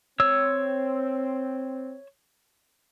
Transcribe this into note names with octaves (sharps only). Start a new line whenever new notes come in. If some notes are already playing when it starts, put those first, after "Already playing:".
C4 C#5 E6